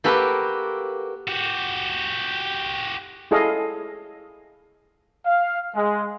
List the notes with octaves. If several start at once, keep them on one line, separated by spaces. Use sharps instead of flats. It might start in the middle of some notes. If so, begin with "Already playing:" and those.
A#3 F#4 G4 A4 B4
F#4 G4
E4 G#4 A4 D#5 F5
F5
G#3